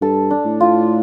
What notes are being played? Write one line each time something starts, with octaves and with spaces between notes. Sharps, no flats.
G2 A4
D4
A2
F4